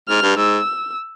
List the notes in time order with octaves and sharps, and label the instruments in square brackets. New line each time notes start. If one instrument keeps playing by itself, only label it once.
[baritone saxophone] G#2 [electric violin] F6
[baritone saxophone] G2
[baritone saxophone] G#2 [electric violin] E6